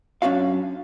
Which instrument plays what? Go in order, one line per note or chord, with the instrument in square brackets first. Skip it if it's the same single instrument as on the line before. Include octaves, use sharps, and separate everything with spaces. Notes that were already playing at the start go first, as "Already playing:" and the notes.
[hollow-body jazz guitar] F#2 C#4 D4 F#4 F5